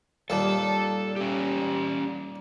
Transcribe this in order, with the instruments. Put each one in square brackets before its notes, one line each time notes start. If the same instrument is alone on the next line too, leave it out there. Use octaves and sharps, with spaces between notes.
[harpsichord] D#2 A#2 G3 [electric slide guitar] A4 A5
[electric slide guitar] C#4 G4